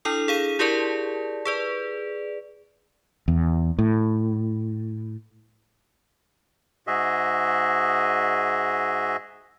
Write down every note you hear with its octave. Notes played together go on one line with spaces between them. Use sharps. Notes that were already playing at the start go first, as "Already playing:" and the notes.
D4 E4 A4 D#6
G#4 F5 D#7
E4 G4 G#4 A#4 D5 A5
G#4 B4 D5
E2
A2
G#2 F#4 G#4 D#5 E5